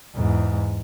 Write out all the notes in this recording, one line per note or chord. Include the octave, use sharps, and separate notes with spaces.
E2 G#2